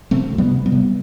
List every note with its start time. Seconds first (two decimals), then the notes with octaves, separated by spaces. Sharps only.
0.11 C3 A3 C4
0.32 D2
0.38 G3 B3
0.51 C3
0.66 G3 B3
0.72 C3